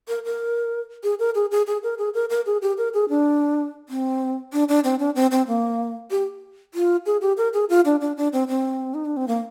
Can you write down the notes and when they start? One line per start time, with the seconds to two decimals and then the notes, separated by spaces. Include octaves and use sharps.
0.08 A#4
0.25 A#4
1.03 G#4
1.19 A#4
1.35 G#4
1.51 G#4
1.67 G#4
1.83 A#4
1.98 G#4
2.14 A#4
2.30 A#4
2.46 G#4
2.62 G4
2.78 A#4
2.94 G#4
3.09 D4
3.89 C4
4.53 D4
4.69 D4
4.84 C4
4.99 D4
5.15 C4
5.31 C4
5.47 A#3
6.11 G4
6.74 F4
7.06 G#4
7.21 G4
7.37 A#4
7.53 G#4
7.69 F4
7.85 D4
8.01 D4
8.17 D4
8.33 C4
8.48 C4
8.94 D#4
9.05 D4
9.17 C4
9.28 A#3